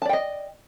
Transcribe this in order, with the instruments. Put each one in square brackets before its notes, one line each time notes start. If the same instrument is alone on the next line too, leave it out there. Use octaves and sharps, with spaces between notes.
[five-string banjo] A5
D5
G5
D#5